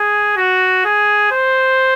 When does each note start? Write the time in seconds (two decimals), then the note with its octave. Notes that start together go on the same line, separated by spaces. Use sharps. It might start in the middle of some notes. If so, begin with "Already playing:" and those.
Already playing: G#4
0.37 F#4
0.85 G#4
1.31 C5